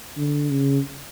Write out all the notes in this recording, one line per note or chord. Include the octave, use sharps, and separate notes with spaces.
D3
C#3